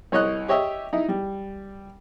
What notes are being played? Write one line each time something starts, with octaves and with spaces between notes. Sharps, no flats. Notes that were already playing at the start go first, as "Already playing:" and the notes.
C2 C#5 D#5 F#6
G4 C#5 D#5 E5
D#4 E4
G3